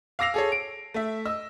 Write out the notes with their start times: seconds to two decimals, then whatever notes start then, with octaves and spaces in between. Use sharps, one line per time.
0.19 F5 D6 E6 A#6 C7 F7
0.34 G#4 A4 C#5
0.52 D7
0.94 A3 E5
1.25 D#5 E6